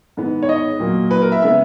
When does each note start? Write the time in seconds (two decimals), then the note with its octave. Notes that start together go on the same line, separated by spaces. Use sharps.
0.17 G#2 D#3 G#3 B3
0.43 C#5
0.49 D#5
0.80 A#2 F#3 A#3
1.11 B4
1.22 A#4
1.32 E5
1.42 C#3 G#3 B3 E5